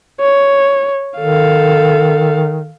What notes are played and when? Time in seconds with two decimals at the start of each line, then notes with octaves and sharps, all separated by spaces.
0.21 C#5
1.19 D#3 A4 F5